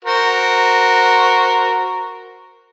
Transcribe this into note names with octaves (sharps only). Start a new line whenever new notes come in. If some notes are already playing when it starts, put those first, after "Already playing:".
F#4 A#4 C5